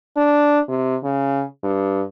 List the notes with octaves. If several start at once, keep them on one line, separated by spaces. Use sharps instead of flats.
D4
C3
C#3
G2